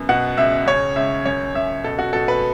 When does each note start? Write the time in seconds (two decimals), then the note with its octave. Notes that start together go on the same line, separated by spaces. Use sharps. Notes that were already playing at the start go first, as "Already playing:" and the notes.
Already playing: F#2 B3
0.09 B2 F#5
0.37 C#2 E5
0.66 C#3 C#5
0.96 C#2 E5
1.25 F#2 C#5
1.54 F#2 E5
1.84 B2 A4
1.99 F#4
2.13 B2 A4
2.28 B4